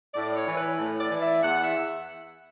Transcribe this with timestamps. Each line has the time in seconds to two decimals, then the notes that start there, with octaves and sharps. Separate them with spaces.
0.14 A2 D5
0.36 C#5
0.47 E3
0.57 B4
0.78 A2
1.00 D5
1.11 E3
1.21 E5
1.43 E2 F#5
1.64 E5